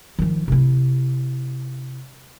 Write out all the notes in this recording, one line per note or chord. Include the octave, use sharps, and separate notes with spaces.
D#3 F3
C3 E4